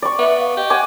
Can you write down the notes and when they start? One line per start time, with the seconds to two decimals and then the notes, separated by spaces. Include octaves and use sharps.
0.02 D5 C#6
0.19 B3 E5
0.39 F5
0.57 G4 D#5
0.70 F#5 G#5 D6